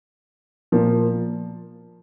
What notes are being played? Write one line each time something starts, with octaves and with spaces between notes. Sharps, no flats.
A#2 F3 A#3